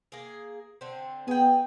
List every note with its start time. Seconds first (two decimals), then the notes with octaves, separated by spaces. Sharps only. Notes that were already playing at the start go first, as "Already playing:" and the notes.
0.12 A#3 G#4
0.81 D3 C4
1.28 B3 G#4 G5